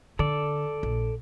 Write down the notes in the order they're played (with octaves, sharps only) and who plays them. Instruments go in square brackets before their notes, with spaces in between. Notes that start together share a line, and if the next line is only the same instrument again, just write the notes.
[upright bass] D3 [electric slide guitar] A4 D5
[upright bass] A#1